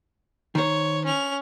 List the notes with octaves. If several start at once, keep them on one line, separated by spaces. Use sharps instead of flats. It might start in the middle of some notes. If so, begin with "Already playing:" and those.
D#3 C5 C#5
C#4 F7